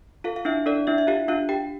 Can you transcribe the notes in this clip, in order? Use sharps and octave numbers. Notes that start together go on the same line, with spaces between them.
F4 A4 F5
F5
D4 E4 E5
D4 A4 D5
D4 E4 E5
E5
F4 G4 F5
D4 F4 F5
G4 G5